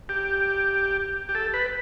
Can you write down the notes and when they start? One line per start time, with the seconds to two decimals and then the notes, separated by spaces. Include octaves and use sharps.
0.09 G4
1.29 G4
1.35 A4
1.54 B4